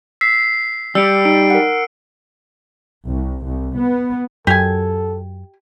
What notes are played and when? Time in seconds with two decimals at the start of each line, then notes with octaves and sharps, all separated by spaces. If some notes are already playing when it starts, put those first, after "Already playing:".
0.21 E6 B6 C7
0.95 G3 E6 C#7 D7
1.25 D#4 D7
1.50 A#4 F#5
3.06 C2
3.45 C2
3.76 B3
4.47 F#2 G4 A4 G#5